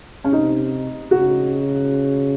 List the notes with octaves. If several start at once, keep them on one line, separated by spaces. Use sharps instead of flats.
C#4
C3 D#4
C#3 F#4